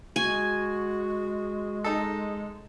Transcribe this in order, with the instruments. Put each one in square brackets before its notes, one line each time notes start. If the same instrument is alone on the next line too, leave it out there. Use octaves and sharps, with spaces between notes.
[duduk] G#3 [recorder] F#4 [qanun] G#5
[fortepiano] D#4 A4